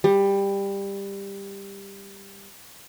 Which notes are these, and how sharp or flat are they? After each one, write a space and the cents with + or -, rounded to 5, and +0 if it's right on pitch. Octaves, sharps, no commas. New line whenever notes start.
G3 +15